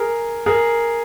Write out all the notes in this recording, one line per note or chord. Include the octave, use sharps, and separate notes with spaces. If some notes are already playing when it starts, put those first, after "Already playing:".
Already playing: G#4 A#4
G#4 A#4